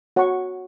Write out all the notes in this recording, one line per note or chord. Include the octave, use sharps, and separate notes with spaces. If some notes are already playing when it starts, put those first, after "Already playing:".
F#4 C#5 F#5 A#5 C#6